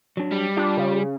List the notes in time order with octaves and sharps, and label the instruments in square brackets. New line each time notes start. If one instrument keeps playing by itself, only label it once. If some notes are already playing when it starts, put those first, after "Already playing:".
[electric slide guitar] F#3 D4
[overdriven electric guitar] G3
[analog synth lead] D4 [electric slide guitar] F4 G4
[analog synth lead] C#3